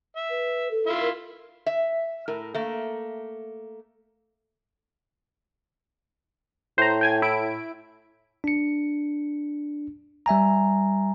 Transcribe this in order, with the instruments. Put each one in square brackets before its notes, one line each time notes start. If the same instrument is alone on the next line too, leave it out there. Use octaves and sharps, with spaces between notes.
[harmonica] E5
[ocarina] B4
A4
[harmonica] E4 F4 E5
[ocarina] A#4
[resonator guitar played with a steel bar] E5
A2 A#4
A3 A#3
[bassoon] A2 [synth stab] C5 A#5
[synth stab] G5 G#5 G#6
E4 D7
[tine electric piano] D4 C#7
G3 E5 G#5 A#5